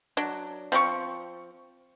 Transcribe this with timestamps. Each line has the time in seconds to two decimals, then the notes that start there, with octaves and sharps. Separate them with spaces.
0.17 F#3 D4
0.72 F3 C4 F4 C#6